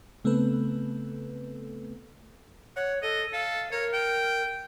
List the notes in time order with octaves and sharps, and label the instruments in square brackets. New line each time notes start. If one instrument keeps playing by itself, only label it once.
[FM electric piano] C#3 A3 B3 C4 A4 B4
[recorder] C#5 [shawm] F#5
[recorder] A4 [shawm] D#5
[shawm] A4 [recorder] F5
[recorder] A#4 [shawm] C#5
[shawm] G5